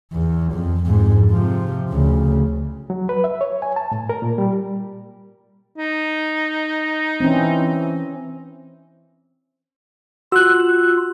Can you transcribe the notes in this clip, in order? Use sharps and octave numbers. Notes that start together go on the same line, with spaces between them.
E2
F2
F2 G#2
C3 F3
D2 C#3
F#3
B4
E5
C#5
G#5
A5
A2
A#4
A#2
G3
D#4
E3 C4 C#4
F4 F#4 E6 F#6